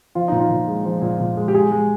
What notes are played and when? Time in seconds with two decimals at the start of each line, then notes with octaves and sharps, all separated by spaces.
0.15 F3 F4
0.28 A#2 D#4
0.40 F4
0.50 A#2
0.68 G#3
0.85 F3
1.02 A#2
1.20 A#2
1.37 G#3
1.48 G4
1.54 G#3 G#4
1.72 G#3